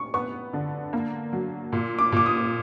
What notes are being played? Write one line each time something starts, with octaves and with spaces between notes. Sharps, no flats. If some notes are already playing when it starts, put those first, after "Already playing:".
Already playing: C#6
B3 C#6
D3
A#3
F#3
A#2
D6
A#2 D6
D#6